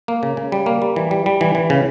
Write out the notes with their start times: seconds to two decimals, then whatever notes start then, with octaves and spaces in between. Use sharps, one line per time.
0.08 A#3
0.23 C#3
0.37 C#3
0.52 G3
0.66 A#3
0.82 G3
0.96 E3
1.11 G3
1.26 G3
1.41 E3
1.55 E3
1.70 C#3